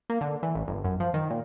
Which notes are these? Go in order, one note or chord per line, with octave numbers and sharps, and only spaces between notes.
A#3
D3
E3
A1
G1
F#2
F3
D#3
A#2